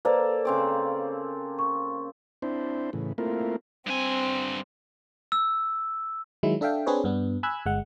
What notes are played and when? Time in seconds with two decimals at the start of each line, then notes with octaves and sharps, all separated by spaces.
0.05 A#3 A4 B4 C5 D5
0.45 C#3 C4 D6
1.59 C#6
2.42 C4 D4 E4 C5
2.93 A2 C#3 E3
3.18 A3 A#3 C4 E4 F4 A#4
3.87 G2 C4 G#5
5.32 E6
6.43 D#3 F#3 G#3 E4
6.61 D4 A4 E5 F5 G5
6.86 C4 D4 G#4 B4 C#5
7.04 G2 B3 D4
7.43 G#5 B5 E6 F#6 G#6
7.66 G1 G#3 F#5